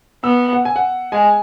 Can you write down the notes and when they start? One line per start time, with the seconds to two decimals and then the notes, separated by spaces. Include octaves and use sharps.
0.24 B3 E6
0.53 F#5
0.65 G#5
0.76 F#5
1.12 G#3 G#5